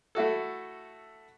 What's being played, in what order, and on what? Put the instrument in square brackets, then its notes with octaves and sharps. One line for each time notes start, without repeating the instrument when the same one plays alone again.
[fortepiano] A3 E4 F#4 A4